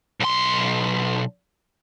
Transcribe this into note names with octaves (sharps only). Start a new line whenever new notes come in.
B1 C6